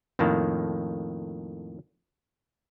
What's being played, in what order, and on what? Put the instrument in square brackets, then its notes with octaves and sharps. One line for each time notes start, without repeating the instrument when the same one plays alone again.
[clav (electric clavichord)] F2 A2 D#3 A#3 A5